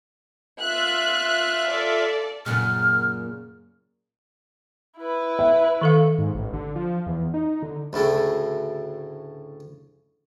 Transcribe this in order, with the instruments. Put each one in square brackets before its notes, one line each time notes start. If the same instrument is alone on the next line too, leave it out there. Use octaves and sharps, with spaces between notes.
[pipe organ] F4 E5 [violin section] F#6
[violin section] A4 D5
[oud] F#2 A#2 C#3 [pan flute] F6
[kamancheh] E4 B4
[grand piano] E5
[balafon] D#3 A4 F5
[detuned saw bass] G#2
A1
D3
F3
E2
D#4
D3
[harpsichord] D2 A2 C#3 A3